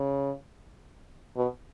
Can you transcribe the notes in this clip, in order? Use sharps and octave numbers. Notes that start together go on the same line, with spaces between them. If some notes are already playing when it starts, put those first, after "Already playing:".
Already playing: C#3
B2